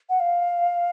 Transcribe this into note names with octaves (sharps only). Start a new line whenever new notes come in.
F#5
F5